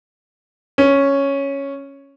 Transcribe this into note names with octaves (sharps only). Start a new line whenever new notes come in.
C#4